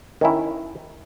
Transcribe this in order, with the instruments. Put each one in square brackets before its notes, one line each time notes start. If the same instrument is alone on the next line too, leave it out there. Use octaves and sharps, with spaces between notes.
[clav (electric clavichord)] D#3 C#4 E4